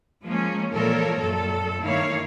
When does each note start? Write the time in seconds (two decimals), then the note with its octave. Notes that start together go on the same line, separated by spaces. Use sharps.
0.24 F3 G#3 A#3 C#4
0.72 A#2 E3 F3 A4 A#4 C#5
1.20 F#2 A#2 A4
1.82 G2 D#3 A#3 E4 C#5 F5